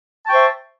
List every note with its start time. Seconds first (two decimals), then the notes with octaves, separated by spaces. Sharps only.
0.25 A5
0.27 G5
0.30 C#6
0.32 C5
0.35 E5